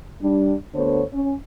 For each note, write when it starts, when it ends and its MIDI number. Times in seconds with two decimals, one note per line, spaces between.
0.22 0.54 55
0.22 0.54 62
0.74 1.02 38
0.74 1.02 50
0.74 1.02 59
0.74 1.02 69
0.74 1.02 72
0.74 1.02 73
1.12 1.33 61